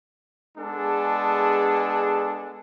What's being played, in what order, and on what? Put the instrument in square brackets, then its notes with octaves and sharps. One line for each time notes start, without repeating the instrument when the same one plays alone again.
[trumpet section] G#3 B3 D4 G#4 A4